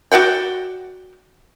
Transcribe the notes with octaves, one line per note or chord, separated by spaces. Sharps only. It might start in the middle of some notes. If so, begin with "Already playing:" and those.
F#4 D5 F#5 G5